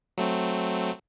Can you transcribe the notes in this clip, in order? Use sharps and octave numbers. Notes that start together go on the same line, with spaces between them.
F#3 A3 C4